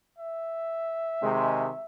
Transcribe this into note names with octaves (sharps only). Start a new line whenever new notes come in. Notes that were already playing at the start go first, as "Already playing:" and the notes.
E5
C3 D#3 G#3